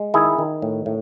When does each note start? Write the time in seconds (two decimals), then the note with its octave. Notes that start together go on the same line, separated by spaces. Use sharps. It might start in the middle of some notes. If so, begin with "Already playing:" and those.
Already playing: G#3
0.14 D#3 E4 G#4
0.38 D#3
0.62 A2
0.86 A2